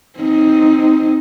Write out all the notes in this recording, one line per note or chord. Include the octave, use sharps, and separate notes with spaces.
C4 D#4